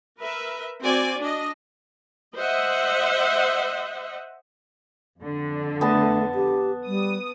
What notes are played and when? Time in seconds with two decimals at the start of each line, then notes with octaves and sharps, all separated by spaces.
0.19 A#4 B4 E5
0.83 C4 F#4 D5 G#5
1.19 D4 D#5
2.36 C5 D#5 E5 F#5
5.18 F2 D3
5.81 A3 B3 A5
6.35 G4
6.86 G3 D#6